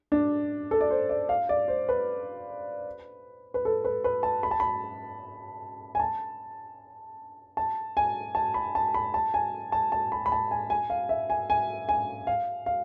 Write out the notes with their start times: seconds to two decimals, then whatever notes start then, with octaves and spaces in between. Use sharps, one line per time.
0.12 D4
0.71 A4
0.81 D5
0.90 C5
1.09 D5
1.29 F5
1.49 D5
1.68 C5
1.89 B4
3.54 B4
3.65 A4
3.85 B4
4.04 B4
4.23 A5
4.43 B5
4.51 A5
4.60 B5
5.95 G#5
6.00 A5
7.57 A5
7.97 G#5
8.35 A5
8.54 B5
8.75 A5
8.94 B5
9.14 A5
9.34 G#5
9.72 A5
9.92 A5
10.12 B5
10.26 B5
10.32 A5
10.51 G#5
10.70 G#5
10.90 F5
11.09 E5
11.30 G#5
11.50 G#5
11.89 G#5
12.27 F5
12.66 F5